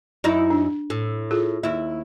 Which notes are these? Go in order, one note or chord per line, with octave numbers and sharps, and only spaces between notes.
F#2 D#4 E4
D4
A2
F4 G#4 A4
D#2 E4